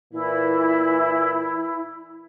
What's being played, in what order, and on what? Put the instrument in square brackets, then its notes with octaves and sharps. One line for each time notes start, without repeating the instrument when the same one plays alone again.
[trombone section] A#2 E3 [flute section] E4